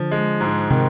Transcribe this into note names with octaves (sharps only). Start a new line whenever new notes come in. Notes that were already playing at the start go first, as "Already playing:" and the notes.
Already playing: D3 F3
G#3
G#2
C3 D#3